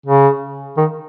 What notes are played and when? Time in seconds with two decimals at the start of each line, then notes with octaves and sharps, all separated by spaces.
0.06 C#3
0.77 D#3